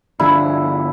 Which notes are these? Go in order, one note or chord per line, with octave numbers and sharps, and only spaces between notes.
G1 D3 F3 E4